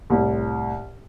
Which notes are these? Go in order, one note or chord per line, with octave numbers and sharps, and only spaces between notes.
C2 A2